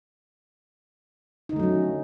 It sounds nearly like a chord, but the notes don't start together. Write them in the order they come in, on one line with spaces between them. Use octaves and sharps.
D#4 D3 A3 F#3 C#4